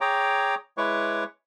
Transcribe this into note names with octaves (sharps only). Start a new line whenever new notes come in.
G#4 C#5 G5 A#5 D6
G#3 E4 B4 C#5 C#6 D6